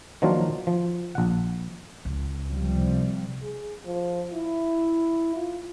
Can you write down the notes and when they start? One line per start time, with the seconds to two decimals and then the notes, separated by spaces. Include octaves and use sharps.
0.22 D#3 F3 F#3 A#3 D4 F4
0.67 F3
1.15 A#1 F#5
2.05 C#2
2.50 C3 F3 G3
3.42 G#4
3.85 F3
4.34 E4
5.36 F4